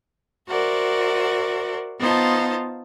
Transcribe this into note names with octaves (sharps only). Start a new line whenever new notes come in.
F#4 A#4 C5 D5 E5 F#5
B3 D#4 F4 C5 F5 A5